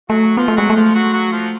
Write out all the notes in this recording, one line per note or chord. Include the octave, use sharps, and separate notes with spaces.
F#3 A3 F#4
F3 B3 F4
A3
F#3 G#3 F#4
A3
F3 F4
F#3 F#4
F#3 F#4
F3 F4